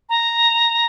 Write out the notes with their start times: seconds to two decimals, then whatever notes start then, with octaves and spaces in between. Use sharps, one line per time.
0.09 A#5